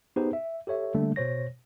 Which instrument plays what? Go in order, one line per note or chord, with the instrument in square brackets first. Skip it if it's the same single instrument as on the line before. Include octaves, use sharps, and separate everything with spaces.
[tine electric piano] B3 D#4 G4 G#4 B4 C5
E5
G4 A4 C#5 E5
D3 G3 A3 A#3 D4
B2 C5 C#5 A#6